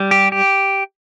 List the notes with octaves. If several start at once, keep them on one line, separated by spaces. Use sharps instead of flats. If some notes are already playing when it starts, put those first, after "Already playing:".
Already playing: G3
G4
G4